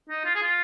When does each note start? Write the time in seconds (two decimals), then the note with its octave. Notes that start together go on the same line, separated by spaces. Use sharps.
0.09 D#4
0.25 F4
0.35 G#4
0.42 F4